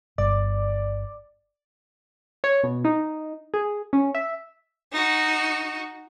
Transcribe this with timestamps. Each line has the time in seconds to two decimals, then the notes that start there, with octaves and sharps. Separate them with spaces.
0.18 G1 D5
2.44 C#5
2.64 B2
2.85 D#4
3.54 G#4
3.93 C#4
4.15 E5
4.92 D#4 F#4